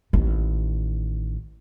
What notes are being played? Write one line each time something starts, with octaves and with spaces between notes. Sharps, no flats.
A1 D#3